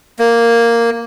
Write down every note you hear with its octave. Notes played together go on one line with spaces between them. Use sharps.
A#3